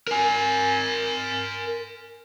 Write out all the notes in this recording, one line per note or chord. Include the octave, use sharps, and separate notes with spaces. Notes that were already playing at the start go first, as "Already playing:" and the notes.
A#4 G#5